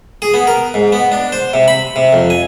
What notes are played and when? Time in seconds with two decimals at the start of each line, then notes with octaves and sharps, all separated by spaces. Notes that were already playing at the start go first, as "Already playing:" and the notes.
0.22 G#4
0.34 B3
0.47 A#4
0.74 G#2
0.92 B3
1.12 D4
1.32 C5
1.54 C3
1.68 B5
1.96 C3
2.13 F2
2.30 G#5